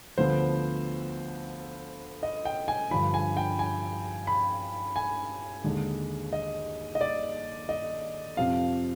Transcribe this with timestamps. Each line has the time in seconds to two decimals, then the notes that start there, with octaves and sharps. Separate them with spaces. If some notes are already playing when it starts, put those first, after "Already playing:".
0.18 D2 D3 F3 B3 C5
2.23 D#5
2.45 G5
2.68 G#5
2.91 G2 D3 F3 B5
3.14 G#5
3.37 G5
3.59 G#5
4.27 B5
4.96 G#5
5.64 D#2 D3 G#3
6.33 D#5
6.95 D#5
7.01 D5
7.69 D#5
8.37 F2 C3 F3 C4 F5